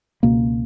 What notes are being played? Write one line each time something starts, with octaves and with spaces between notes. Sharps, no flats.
C#2 B2 A#3